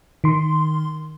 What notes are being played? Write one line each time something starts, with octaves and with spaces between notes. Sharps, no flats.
D#3 C6